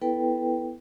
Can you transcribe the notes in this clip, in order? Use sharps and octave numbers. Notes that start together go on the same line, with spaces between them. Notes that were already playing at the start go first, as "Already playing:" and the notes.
B3 E4 A4 B4 G5